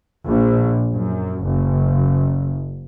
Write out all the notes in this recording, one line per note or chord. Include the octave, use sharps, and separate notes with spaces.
A#1
F#2
F#1